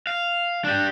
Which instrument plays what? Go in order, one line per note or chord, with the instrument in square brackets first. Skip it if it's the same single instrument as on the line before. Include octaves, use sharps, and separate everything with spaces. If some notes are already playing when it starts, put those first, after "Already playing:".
[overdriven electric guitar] F5
D4 G4